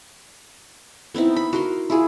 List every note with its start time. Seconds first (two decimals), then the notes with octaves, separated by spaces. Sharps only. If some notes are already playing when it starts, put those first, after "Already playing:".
1.14 B3 C4 D#4 E4
1.36 B5
1.53 F#4 A#4 C6
1.90 E4 F4 G#4